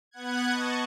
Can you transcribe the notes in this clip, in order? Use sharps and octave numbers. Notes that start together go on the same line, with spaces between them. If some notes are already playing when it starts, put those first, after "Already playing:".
B3 F#5 F#6 G#6
D#5 A5 C#6